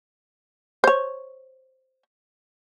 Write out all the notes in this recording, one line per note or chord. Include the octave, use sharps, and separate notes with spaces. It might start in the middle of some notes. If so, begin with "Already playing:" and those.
C5 C#5